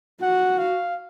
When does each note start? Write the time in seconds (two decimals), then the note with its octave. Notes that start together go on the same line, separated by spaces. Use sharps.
0.22 F#4 F#5
0.58 F5